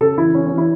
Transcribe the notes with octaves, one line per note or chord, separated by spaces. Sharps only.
C#3 A4
E3 E4
E3 C#4
C#4
E3
E4